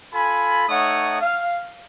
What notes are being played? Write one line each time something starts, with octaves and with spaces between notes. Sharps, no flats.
F4 A4 G#5 B5
A3 D#4 C#5 F#5 D#6
F5